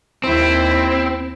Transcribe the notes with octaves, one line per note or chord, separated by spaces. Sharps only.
D#2 C4 E4